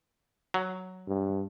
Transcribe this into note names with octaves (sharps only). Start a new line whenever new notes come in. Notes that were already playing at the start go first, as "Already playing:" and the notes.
F#3
G2